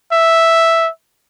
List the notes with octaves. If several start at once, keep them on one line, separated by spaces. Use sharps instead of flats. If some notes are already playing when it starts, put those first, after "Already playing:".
E5